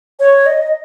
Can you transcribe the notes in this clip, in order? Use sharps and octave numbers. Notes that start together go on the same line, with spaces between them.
C#5
D#5